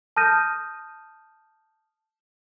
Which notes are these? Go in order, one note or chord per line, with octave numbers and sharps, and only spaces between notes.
A5 D#6 F6 G6 A#6 D#7